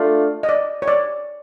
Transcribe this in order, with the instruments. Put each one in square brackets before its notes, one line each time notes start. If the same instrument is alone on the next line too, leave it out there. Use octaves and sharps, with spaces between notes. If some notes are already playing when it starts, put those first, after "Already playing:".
Already playing: [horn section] A3 D4 F4
[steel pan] D#5
D5
C#5
D5